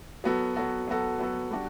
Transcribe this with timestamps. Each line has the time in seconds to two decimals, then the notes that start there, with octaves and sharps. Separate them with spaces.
0.24 F#3 B3 F#4 A4
0.55 F#3 B3 F#4 A4
0.88 F#3 B3 F#4 A4
1.19 F#3 B3 F#4 A4
1.51 G3 D4 F#4